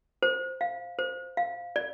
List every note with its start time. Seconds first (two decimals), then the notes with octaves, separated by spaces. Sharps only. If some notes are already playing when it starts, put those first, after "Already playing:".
0.22 C5
0.61 F5
0.99 C5
1.37 F5
1.76 D5